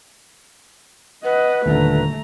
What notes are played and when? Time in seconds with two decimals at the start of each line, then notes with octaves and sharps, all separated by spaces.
1.25 B4 D#5 F#5
1.66 D#1 D3 A3 A#5